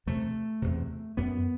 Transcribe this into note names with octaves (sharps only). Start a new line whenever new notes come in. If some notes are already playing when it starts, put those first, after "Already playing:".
E2 C3 A3
E2 C3
F#2 B3